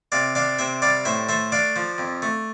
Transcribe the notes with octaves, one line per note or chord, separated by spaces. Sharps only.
C3 D5 F5
D4 D5 F5
C3 C5 E5
G3 D5 F5
A2 C5 E5
A3 C5 E5
D4 D5 F5
F3
F2
A3